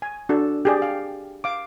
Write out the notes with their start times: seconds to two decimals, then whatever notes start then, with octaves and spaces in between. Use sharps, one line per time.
0.02 G#5
0.29 D4 F#4 A4
0.65 G4 G#4 D5
0.82 F5 G5
1.44 F5 D6